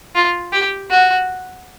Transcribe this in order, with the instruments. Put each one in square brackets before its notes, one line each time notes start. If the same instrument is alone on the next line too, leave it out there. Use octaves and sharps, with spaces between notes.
[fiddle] F4
G4
F#4